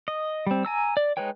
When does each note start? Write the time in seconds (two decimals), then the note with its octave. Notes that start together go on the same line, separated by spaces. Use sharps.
0.08 D#5
0.47 G3 C4
0.65 G#5 A#5 E6
0.97 D5
1.17 G#3 D#4 B4 C#5 G5